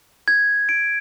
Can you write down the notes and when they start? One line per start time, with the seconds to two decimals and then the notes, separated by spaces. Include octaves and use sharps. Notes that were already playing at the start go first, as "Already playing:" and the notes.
0.28 G#6
0.69 D7